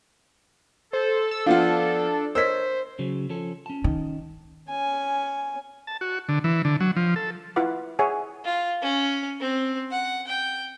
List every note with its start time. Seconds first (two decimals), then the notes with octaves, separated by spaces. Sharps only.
0.93 A4 C5
1.31 E6
1.46 F3 B3 D4 F4 F5 F#5
2.35 A#4 C5 C#5 D#5 E6 B6
2.99 C#3 F#3
3.30 F3 C#4 A4
3.66 C#4 A5
3.84 D#3
4.69 C#4 G#5
5.87 A5
6.01 F#4
6.29 D3
6.44 E3
6.65 D3
6.80 F#3
6.96 F3
7.16 A4
7.56 E4 F4 B4 F#5 D6
7.99 G#4 C#5 E5 F#5 G#5
8.44 F4
8.82 C#4
9.40 C4
9.91 F#5
10.27 G5